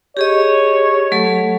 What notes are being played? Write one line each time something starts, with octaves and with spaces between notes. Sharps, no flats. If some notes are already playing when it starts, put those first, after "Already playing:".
G4 G#4 C#5 D#5
F#3 A3 A4